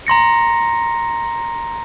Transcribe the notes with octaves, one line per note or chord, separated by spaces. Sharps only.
A#5 C6 A#6 C#7